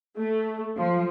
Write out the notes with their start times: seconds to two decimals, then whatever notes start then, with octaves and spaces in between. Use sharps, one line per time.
0.17 A3
0.76 F3